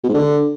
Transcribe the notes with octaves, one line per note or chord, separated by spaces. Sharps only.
B2
G#2
D3